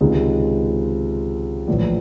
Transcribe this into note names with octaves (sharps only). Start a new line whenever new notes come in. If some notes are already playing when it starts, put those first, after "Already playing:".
C#2 C3 D#3 G#3
A#1 A2 E3